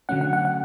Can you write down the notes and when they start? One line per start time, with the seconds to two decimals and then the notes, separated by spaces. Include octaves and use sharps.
0.09 D3 F#3 A3 C#4 F#5
0.21 F#5
0.33 F#5
0.45 F#5